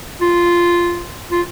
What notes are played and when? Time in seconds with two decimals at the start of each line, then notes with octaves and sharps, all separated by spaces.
0.21 F4
1.31 F4